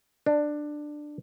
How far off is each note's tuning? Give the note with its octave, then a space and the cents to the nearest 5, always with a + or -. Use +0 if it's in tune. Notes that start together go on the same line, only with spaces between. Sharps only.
D4 +15